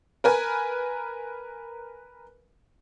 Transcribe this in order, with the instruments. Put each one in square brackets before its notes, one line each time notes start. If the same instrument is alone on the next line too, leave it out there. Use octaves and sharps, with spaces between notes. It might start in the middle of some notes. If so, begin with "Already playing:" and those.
[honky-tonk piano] A#4 B4 G#5